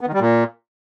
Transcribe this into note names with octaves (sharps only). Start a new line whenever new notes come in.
B3
D#3
G3
A#2